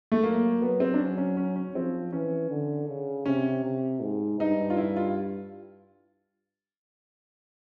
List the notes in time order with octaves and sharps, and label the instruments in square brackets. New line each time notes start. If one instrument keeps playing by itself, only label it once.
[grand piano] A3
[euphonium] F#3 [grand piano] A#3
[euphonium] F#3 [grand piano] B3
[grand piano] C4
D4
[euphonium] F#3 [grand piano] C#4
[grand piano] C#4
C#4
C#4
[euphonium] F3 [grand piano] C4
[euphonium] E3 [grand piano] C#4
[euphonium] D3
C#3
[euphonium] C3 [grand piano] C#4
[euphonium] C3
G#2
[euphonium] G2 [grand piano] D#4
[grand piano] F4
E4
F4